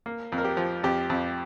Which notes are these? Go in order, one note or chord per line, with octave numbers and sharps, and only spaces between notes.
A#3
F2
A#4
G4
F3
F2 G4
F2